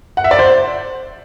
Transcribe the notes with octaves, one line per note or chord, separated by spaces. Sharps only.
F#5
E5
D5
C5